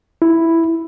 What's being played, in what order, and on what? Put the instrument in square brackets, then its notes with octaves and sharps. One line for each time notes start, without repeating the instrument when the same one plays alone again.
[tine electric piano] E4